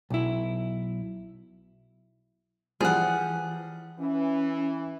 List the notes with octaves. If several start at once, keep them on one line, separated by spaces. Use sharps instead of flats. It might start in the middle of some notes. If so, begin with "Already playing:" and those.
B1 E4
E3 F3 G3 G#4 F#5
E3 C#4